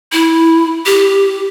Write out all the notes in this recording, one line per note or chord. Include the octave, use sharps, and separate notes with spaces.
E4
G4